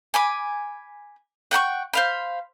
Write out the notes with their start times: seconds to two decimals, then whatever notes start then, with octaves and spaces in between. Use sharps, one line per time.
0.14 G#5 B5 D6
1.51 F#5 G5 B5 C#6
1.93 C5 F5 B5